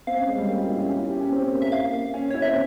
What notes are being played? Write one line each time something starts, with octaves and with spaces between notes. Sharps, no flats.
C4 F5
C#4
G#3
G3
A#3
F4
E4
C#4
C#4
E4
G4
C#4
C4
A#3
E5
A#3 F5
C#4
E4 C#5
C4 E5